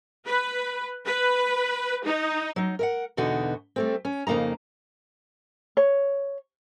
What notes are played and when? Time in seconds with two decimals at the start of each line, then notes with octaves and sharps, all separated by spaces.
0.25 B4
1.06 B4
2.05 D#4
2.56 F#3 D#4
2.79 A#4 E5 F#5
3.17 E2 B2 D3 D#4 F#4
3.76 G3 A3 C4
4.05 C#4
4.27 F2 C#3 A#3 D#4 A#5
5.77 C#5